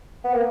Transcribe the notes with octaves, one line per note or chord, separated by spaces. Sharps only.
B3
A#3